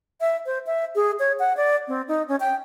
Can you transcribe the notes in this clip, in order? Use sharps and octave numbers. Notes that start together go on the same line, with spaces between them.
E5
C5
E5
G#4
C#5
F#5
D5
C4
D#4
C#4
G5